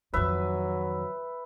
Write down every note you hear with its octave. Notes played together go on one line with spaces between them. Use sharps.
F2 D#3 F#3 B4 E5